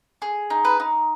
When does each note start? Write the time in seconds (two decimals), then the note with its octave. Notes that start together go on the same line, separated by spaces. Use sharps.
0.22 G#4
0.50 D#4
0.65 B4
0.80 D#4